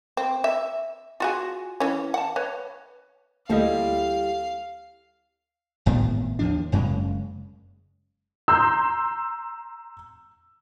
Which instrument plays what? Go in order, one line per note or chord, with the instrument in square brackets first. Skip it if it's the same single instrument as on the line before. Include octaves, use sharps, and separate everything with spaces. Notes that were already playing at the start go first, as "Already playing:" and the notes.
[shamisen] C4
E5
F4 F#4 G#4
E3 C#4
F#5 A5
B4 C#5
[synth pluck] D2 A#3 D#5 [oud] G3 C4 E4 [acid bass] A4 [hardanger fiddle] F5
[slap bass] G#1 A2 C3 B3
D#2 F3 D4
F#1 F#2 C#3 G#3
[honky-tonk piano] A#5 C6 G6 [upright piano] E6